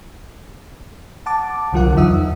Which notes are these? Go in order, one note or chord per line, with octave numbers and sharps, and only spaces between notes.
F#5 A5 D6
C2 D3 F#3 F4 A#4 F#5
E2 D#4 E5 D#6
E2